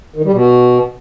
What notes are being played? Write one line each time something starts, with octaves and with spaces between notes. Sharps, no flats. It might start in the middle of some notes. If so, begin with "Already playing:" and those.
D#3
G3
B2